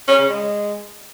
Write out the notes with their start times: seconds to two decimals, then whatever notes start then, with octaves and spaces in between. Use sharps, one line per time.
0.07 C#4
0.18 C#3
0.29 G#3